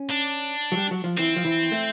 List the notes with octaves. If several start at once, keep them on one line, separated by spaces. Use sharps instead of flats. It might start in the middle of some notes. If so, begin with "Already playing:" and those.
Already playing: C#4
D4
F#3
G3
F#3
F3
E3 C4
F3
E3
A3